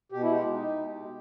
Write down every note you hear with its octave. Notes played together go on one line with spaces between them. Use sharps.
B2 G4
E4
G#3 G4
D#4
B2
G#3